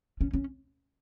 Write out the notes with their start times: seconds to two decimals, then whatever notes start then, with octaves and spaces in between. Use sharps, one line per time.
0.21 C#4
0.33 C#4